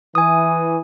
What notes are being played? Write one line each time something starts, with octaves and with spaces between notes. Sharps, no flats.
E3 G#5 D#6